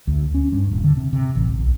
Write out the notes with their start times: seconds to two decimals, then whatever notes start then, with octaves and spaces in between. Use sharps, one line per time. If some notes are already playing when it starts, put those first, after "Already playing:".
0.07 D2
0.35 C#4
0.52 G2
0.71 D#1
0.84 D3
0.97 C3
1.13 C3
1.35 A1
1.47 C#2
1.58 B1